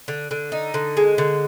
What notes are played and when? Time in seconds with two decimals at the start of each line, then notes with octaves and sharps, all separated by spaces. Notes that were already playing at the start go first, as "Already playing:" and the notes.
0.08 D3
0.31 D3
0.52 D#4
0.74 D3
0.97 G#3
1.18 D3